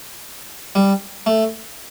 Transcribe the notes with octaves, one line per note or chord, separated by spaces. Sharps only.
G3
A3